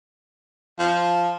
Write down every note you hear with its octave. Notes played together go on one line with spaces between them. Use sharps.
F3